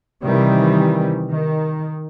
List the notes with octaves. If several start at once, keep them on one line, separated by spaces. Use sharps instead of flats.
C3 D#3 E3 G3
D#3